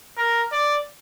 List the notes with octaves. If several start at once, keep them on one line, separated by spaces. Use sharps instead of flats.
A#4
D5